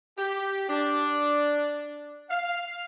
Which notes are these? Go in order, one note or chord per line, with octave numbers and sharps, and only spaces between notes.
G4
D4
F5